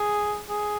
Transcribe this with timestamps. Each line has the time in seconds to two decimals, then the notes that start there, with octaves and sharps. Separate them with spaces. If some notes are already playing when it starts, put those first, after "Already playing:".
Already playing: G#4
0.50 G#4